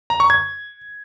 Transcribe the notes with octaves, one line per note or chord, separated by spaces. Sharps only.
A#5
C#6
G#6